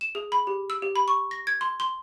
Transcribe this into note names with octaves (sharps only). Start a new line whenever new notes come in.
E7
G#4
B5
G4
E6
G4
B5
C#6
A#6
G#6
C6
C6